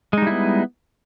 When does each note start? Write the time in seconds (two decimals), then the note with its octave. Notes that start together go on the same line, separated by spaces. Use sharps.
0.13 G#3
0.18 D#4
0.22 G3
0.27 E4
0.31 B3